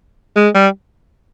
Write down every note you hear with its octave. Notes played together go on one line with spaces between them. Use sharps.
G#3
G3